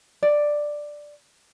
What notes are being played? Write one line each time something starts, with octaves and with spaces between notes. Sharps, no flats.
D5